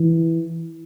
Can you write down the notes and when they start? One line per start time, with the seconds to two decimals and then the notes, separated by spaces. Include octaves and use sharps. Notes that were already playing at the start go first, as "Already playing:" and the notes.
Already playing: E3